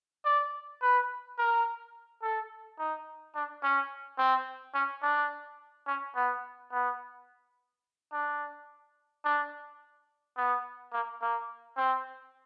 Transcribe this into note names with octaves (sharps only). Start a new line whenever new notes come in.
D5
B4
A#4
A4
D#4
D4
C#4
C4
C#4
D4
C#4
B3
B3
D4
D4
B3
A#3
A#3
C4